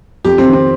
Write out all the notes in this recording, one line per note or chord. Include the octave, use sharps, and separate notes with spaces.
F2 G4
C4
D#3
C4